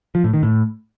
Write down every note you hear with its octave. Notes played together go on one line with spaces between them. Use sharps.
F3
A2
D#3
A2